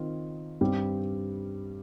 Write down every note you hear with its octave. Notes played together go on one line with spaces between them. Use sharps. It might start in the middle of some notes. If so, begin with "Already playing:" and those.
Already playing: D#3 C4 F4
G2 G3 C4 G4